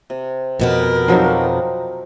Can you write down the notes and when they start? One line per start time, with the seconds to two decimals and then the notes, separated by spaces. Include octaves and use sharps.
0.10 C3
0.60 F2 B2 B3 A#4
1.08 F3 F#3 C4 D#4 F#4 G4